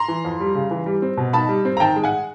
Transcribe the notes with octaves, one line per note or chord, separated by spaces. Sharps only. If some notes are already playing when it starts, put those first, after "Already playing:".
Already playing: A#5 C6
E3
F2
G3
C#3
E3
G3
C4
B2
D#4 A5 B5
G3
C4
A#5
D#3 G5 A5
G#3
F#5 G#5